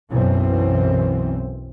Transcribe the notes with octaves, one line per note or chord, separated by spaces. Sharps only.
B1 F#2 B2 E3 C4